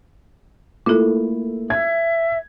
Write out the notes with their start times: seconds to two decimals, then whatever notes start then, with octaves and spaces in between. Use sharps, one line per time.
0.86 A3 A#3 E4 F4 A4
1.70 E5 G#6